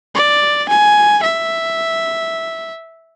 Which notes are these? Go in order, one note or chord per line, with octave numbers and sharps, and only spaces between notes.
D5
G#5
E5